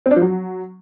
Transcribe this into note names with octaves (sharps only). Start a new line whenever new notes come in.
C4
D4
F3
F#3